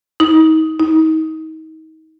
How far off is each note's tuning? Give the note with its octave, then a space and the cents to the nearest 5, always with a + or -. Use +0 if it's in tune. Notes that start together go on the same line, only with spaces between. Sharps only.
D#4 +35
D#4 +35